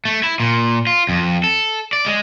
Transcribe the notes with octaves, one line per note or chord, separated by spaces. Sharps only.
A3
E4
A#2
F4
F2
A4
D5
G#3